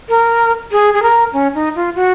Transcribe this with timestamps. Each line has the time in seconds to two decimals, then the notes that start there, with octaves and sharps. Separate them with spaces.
0.09 A#4
0.72 G#4
0.94 G#4
1.03 A#4
1.33 C#4
1.54 D#4
1.75 F4
1.95 F#4